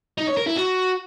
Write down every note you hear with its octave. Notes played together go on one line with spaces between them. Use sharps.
D#4
C#5
A#4
E4
F#4